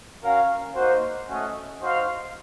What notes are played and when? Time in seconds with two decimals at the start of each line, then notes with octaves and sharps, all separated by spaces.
0.23 C#4 F#4 A#4 F5
0.75 A#3 D#4 F#4 C5
1.28 A3 C#4 F#4 A4 D#5
1.80 D#4 F#4 C5 F5